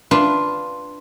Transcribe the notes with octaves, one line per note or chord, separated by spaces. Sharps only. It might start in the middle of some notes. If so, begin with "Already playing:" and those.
D4 F4 B4